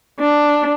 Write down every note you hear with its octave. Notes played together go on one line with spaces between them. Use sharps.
D4